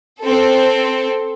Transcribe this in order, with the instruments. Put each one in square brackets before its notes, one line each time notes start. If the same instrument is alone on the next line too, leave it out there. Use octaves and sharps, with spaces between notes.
[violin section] C4 A4